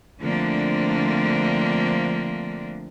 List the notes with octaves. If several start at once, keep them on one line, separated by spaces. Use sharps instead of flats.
D3 F3 A3 A#3 C4 D4